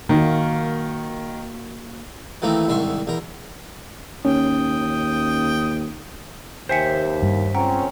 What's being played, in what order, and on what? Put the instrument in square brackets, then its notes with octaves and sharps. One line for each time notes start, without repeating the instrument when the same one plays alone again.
[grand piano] D#3 [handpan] A#3 F#4
[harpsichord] D#3 E3 A3 A#3 C4 D#4
C2 G#2 D#3 E5 C6 C#6
E2 A#4
[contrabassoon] D#2 [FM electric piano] C#4 [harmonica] G5 D#6
[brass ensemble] D#2 [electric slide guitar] C5 E5 [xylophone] G5 G#5 C#7
[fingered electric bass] G2
[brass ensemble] C#2 C4 C#4 [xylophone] F#5 G5 A#5